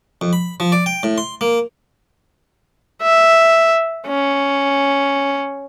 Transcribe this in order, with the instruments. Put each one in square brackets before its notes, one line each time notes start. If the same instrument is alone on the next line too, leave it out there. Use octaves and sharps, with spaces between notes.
[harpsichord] F2
B5
F3
D5
G5
A2
C6
A#3
[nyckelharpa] E5
C#4